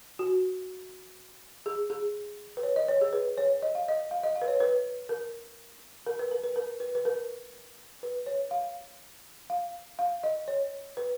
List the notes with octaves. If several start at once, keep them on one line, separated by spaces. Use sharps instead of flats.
F#4
G#4
G#4
B4
C#5
D#5
C#5
G#4
B4
C#5
D#5
F5
D#5
F5
D#5
F5
B4
C#5
B4
A#4
A#4
B4
A#4
B4
A#4
B4
B4
A#4
B4
C#5
F5
F5
F5
D#5
C#5
B4